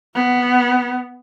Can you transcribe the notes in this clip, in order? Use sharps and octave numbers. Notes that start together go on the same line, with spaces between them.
B3